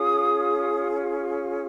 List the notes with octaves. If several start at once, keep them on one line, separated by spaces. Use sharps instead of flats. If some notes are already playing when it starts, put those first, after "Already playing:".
Already playing: C#4 F4 G#4 D#6